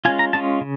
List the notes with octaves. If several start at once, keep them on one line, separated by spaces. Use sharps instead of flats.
G#3 C#4 F4 G#5
A#5
G#3 C#4 F4 A5
C#3